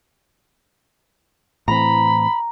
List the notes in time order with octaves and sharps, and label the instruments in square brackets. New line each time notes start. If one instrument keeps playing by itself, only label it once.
[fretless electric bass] A2 E3 C4 [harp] A#5 [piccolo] B5